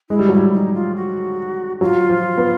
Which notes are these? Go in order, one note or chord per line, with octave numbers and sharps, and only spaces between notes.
G#3 E4
G3
F#3 E4
G3
D#4
F4
F#4
F#3 F4
F3
B3